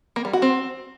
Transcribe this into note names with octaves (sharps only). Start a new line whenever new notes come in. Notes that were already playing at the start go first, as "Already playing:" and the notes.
A#3
G3
F#4
C4